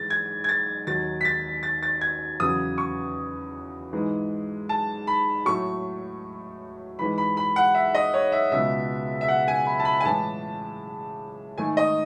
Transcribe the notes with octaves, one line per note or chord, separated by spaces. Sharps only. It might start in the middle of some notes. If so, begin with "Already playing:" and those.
Already playing: G#2 E3 G#3 A6
G#6
G#6
A6
D#2 D#3 F#3 A6
B6
A6
A6
A6
G#6
E2 C#3 F#3 D#6
C#6
G#2 E3 G#3
A5
B5
A2 F#3 A3 C#6
G#2 E3 G#3 B5
B5
B5
F#5
E5
D#5
C#5
E5
C#2 B2 G#3 E5
E5
F#5
G#5
B5
A5
B5
G#5
A2 E3 G#3 A5
G#2 D#3 A3 G#5
D#5